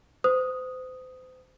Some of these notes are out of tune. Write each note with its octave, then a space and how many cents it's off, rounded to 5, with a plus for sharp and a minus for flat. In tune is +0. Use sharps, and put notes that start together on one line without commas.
C5 -35 D#6 +0